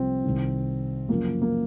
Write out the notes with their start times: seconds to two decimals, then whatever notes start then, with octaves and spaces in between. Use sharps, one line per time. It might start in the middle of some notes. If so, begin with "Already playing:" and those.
Already playing: C2 C3 F3 C4
0.24 C2 C3 D#3
1.09 F#2 C#3 F3 A#3
1.42 A#3